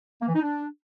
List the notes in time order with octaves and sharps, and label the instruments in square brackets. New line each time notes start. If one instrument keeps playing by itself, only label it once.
[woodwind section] A#3
E3
D#4
D4